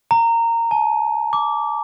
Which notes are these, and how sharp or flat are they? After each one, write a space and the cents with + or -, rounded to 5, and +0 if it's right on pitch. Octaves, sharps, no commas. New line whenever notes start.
A#5 -15
A5 -45
D6 -15